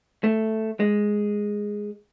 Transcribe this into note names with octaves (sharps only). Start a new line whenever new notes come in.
A3
G#3